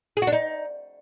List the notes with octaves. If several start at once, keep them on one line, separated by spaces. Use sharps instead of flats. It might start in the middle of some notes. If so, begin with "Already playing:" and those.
G#4
F#4
D4
D#4